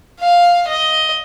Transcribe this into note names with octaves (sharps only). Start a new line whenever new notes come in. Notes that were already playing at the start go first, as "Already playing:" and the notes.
F5
D#5